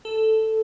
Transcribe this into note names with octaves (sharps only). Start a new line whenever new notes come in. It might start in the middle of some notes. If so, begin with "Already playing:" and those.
A4